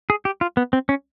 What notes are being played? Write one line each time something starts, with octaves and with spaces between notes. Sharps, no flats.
G#4
G4
F4
B3
C4
C#4